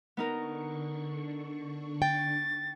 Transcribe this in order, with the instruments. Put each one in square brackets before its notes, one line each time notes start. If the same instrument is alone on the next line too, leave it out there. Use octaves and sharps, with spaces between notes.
[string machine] D3 D4 C#6 [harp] B3 D#4 A#4
[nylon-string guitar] G5 [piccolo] A6